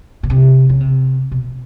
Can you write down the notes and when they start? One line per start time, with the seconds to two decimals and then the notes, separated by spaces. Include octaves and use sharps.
0.23 B2
0.30 C3
0.69 C#3
0.80 C3
1.31 B2